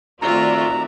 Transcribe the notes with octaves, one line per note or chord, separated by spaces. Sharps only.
D#3 A3 C4 F4 F#4 D5 E5 A#5